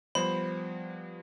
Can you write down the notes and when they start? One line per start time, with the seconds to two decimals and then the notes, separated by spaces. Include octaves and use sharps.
0.15 F3 G3 B3 C5 B5